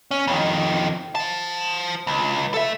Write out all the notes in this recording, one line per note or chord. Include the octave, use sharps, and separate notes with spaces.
C#4
F2 D#3
C5 A5
C#2
A4 E5